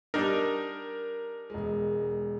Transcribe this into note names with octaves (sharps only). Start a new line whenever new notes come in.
G3 D4 D#4 A#4
E1 G#3